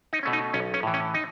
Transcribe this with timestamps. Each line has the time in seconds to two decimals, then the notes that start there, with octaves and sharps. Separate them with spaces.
0.13 D#4
0.23 B2 A3 C#4
0.33 D#4
0.54 B1 C#4
0.74 C#4
0.83 A2 E3
0.94 C#4
1.14 D#4